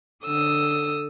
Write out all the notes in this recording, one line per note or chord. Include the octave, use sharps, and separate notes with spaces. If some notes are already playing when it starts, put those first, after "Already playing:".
D3 A4 D#6 E6